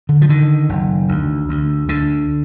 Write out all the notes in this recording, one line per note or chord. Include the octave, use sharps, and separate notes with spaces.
D3
F3
D3 D#3
F#1
D2
D2
D2 D3